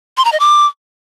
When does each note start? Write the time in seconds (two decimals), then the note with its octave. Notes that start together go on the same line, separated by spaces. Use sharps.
0.17 C6
0.25 A#5
0.32 D#5
0.40 D6